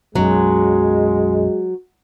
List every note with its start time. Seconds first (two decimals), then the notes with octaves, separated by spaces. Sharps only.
0.15 B1 F#2 F#3 G#3